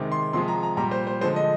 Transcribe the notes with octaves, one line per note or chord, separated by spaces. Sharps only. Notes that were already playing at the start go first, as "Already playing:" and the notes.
Already playing: C3 D#3 G#3
C6
C3 F3 G#3 C6
A#5
A#5
A#2 G3 A#5
C5
C5
D3 F3 G#3 C5
D#5